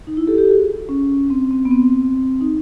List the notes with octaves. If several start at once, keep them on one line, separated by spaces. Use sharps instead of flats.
D#4
E4
G4 A4
G4 A4
F#4 G#4
C#4
C4
C4
B3
C4
D#4